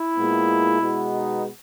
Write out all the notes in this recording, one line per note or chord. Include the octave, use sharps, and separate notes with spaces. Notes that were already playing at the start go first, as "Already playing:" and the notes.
Already playing: E4
A#2 G#3 B3
B2 G#3 B3
D#4